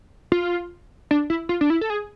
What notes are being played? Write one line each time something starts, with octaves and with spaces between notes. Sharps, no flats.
F4
D4
E4
F4
D4
E4
A4
G#4